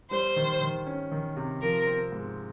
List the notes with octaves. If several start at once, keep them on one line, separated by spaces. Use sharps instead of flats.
G3 C5
D#3
D#3
C#4
D#3
C3
F3 A#4
C4
G#2